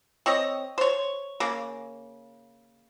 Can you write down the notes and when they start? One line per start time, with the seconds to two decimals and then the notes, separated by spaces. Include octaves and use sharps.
0.26 C4 C#5 D#5
0.78 C5 C#5
1.40 C#3 A#3